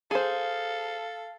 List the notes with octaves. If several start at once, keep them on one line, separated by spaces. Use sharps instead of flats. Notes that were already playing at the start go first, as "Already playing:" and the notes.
G#4 A4 C5 F5